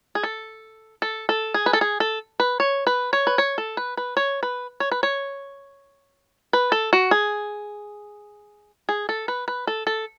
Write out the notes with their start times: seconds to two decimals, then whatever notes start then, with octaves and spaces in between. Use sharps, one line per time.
0.15 G#4
0.23 A4
1.02 A4
1.29 A4
1.54 G#4
1.66 B4
1.73 A4
1.81 G#4
2.00 A4
2.40 B4
2.60 C#5
2.87 B4
3.13 C#5
3.27 B4
3.38 C#5
3.58 A4
3.77 B4
3.97 B4
4.17 C#5
4.43 B4
4.80 C#5
4.91 B4
5.03 C#5
6.53 B4
6.72 A4
6.93 F#4
7.11 G#4
8.89 G#4
9.09 A4
9.28 B4
9.48 B4
9.67 A4
9.87 A4